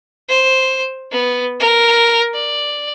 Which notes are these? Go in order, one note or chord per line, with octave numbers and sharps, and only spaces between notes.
C5
B3
A#4
D5